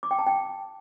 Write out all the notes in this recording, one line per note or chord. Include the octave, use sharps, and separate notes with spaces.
D6
G5
A5
G5